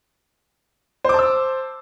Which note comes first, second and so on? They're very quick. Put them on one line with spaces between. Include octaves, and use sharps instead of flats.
C5 D6 A5 E6